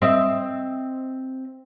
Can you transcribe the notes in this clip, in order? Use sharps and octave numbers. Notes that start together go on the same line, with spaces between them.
C4 D#5 E5